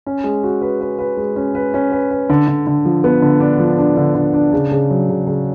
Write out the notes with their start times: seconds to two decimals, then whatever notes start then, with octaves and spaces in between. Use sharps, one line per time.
0.06 C#4
0.24 G#3
0.44 F#4
0.62 B4
0.81 B4
0.99 B4
1.17 G#3
1.36 C#4
1.55 B4
1.74 C#4
1.92 B4
2.11 B4
2.29 D3
2.47 D3
2.67 D3
2.85 F3
3.04 B3
3.22 D3
3.40 D4
3.60 F3
3.79 D4
3.97 D3
4.15 D3
4.34 D4
4.53 C#3
4.71 C#3
4.90 F#3
5.09 C#3
5.27 C#3